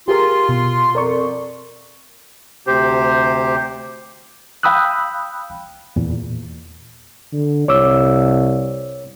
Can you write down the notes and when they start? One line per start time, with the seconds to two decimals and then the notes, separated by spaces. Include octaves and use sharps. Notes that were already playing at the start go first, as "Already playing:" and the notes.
0.08 F4 G4 G#4 A#4 C6
0.49 B2
0.95 F2 A#4 D5 C#6
2.67 D2 C3 G4 C5
4.63 F5 G5 B5 D#6 E6 F#6
5.96 E2 A#2
7.33 D3
7.68 C2 C#5 D6 E6